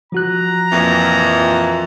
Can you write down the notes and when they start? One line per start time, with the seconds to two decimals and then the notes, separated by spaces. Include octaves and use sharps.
0.12 F3 F#4 A#5 F#6
0.71 F2 A#2 E3